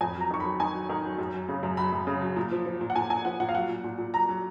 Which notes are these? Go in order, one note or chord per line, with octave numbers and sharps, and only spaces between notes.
F2 G#5
F#3
A#5
D#3 C#6
B5
F#3
D#3 G#5
F#3
D#3
F#3
F#2
F#3
C#3
F#2
F#3 B5
F#2
C#3
F#3
A#2
F3
F3
A#2
F#5
A#2 G#5
A#2 G#5
F3 F#5
A#2 F#5
F5
F#3 F#5
A#2
A#2
A#2
F#3 A#5
F#3